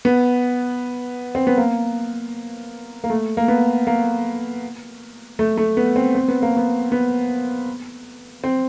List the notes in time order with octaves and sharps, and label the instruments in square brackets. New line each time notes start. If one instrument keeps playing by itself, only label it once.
[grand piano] B3
C4
B3
A#3
A#3
A3
A#3
B3
A#3
A3
A3
B3
C4
C4
B3
A#3
B3
B3
C4